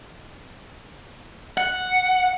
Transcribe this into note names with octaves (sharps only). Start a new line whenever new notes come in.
F#5